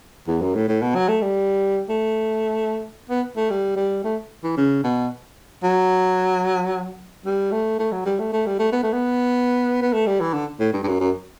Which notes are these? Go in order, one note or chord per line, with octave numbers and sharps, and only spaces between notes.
E2
F#2
A2
A2
B2
F#3
A3
G3
A3
B3
A3
G3
G3
A3
E3
C#3
B2
F#3
G3
A3
A3
F#3
G3
A3
A3
G3
A3
B3
A3
B3
B3
A3
G3
E3
D3
A2
G2
G2
F#2
F#2